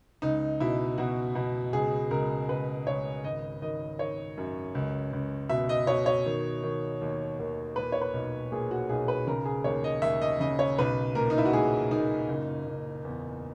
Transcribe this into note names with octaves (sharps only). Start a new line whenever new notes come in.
C#2 D#4
B2 E4
B2 F#4
B2
C#2 G#4
C#2 A#4
C#2 B4
C#2 C#5
G#1 D#5
D#3 D#5
D#3 C#5
F#2
C#2
C#2
B2 E5
D#5
B2 C#5
C#5
D#3
D#3
D#2
D#2
A#2 B4
C#5
B4
B1
A#2 G#4
F#4
B1 G#4
B4
C#3 A#4
G#4
D#2 C#5
D#5
D#2 E5
D#5
C#3 D#5
C#5
B1 B4
A#2 A#4
D#4
E4
F#4
A#2 G#4
A#2 D#4
F#1
F#1
E2